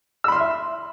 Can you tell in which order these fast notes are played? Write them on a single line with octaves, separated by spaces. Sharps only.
E6 B5 C6 F6 E5